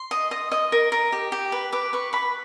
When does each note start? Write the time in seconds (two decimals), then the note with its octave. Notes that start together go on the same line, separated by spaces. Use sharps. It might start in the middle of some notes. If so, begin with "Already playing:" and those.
Already playing: C6
0.11 D#5
0.31 D#5
0.52 D#5
0.72 A#4
0.92 A#4
1.12 G4
1.32 G4
1.52 B4
1.72 B4 D6
1.93 B4 C#6
2.13 B4 B5